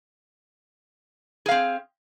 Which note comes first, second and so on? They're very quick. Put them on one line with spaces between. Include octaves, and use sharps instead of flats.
G#4 F5 C4